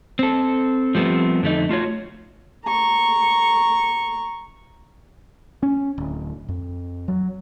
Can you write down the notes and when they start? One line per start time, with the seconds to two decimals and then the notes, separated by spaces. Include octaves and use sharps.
0.19 C4 A4
0.95 F3 G3 A3 B3 C4
1.42 F2 D3 A3 D#4
1.69 A3 F4 F#4 C#5
2.65 A#5 C#6
5.63 C#4
5.98 D1
6.48 F2
7.08 F#3